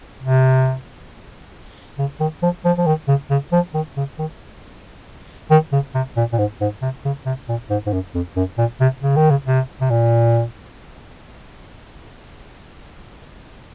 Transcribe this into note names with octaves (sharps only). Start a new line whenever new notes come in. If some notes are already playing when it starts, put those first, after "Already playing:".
C3
C#3
D#3
F3
F3
F3
D#3
C#3
C#3
F3
D#3
C#3
D#3
D#3
C#3
C3
A#2
A#2
G#2
G#2
C3
C#3
C3
A#2
G#2
G#2
F#2
F2
F#2
A#2
C3
C#3
D#3
C#3
C3
C3
A#2